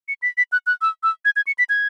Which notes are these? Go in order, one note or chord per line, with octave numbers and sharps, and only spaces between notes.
C#7
B6
B6
F#6
F#6
E6
E6
G#6
G#6
C#7
B6
G#6